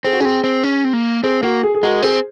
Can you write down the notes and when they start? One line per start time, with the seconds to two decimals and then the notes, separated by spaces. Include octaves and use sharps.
0.05 C4 G#4
0.13 F#4
0.20 C#4 G#4
0.25 C4
0.44 C4
0.63 C#4
0.85 C4
0.93 A#3
1.23 C4 G#4
1.43 A#3 F#4
1.63 G#4
1.75 G#4
1.83 G#3 F#4 A#4
2.02 C4 G#4 C5